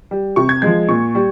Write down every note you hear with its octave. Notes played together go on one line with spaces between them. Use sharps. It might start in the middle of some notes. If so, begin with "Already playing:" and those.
G3
C3 C#6
G#6
F3 G#3 G#6
A#2 C#6
G3